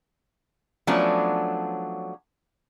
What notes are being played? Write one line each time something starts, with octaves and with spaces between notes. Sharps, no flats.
F3 F#3 A3 B3 C#4 D4